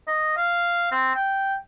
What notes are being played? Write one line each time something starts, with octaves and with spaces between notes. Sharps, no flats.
D#5
F5
C4
G5